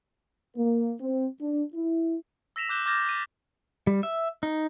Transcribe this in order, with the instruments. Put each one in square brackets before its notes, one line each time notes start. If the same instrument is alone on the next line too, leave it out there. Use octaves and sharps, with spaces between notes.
[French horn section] A#3
C4
D4
E4
[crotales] E6 A#6 B6 E7 F7
D6 F#6 G6 E7 G7
D6 F6 G6 A6 A#6
A6 D#7
[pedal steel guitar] G3
E5
D#4